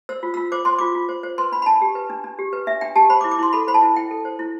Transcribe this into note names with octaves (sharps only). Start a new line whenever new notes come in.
C5 E6
F4
F4 E6
C5 D6
C5 C6
F4 D6
F4
C5
C5
B4 C6
D4 B5
B5
D4 A5
G4
B4
D4
D4
G4
B4
D4 E5
D4 G5
G4 A5
C5 B5
D6
E4
D6
E4 C6
A4 B5
C5 B5
A5
E4
E4 G5
A4
C5
E4